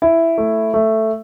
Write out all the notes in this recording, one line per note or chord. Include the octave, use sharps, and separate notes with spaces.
E4
A3
A3